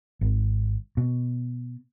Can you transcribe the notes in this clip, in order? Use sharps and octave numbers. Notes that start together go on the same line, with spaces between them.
G#1
B2